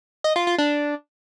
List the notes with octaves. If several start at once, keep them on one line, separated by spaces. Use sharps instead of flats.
D#5
F4
F4
D4